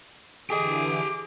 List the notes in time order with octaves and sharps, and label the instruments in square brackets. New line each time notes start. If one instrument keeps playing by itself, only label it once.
[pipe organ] D3 E3 [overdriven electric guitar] G4 G#5 [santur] G#4 D#5 [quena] D6